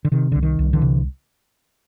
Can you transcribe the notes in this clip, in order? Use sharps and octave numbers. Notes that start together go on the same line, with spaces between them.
D3
C3 D#3
C2 D3
D#3
C2
D3 E3
C3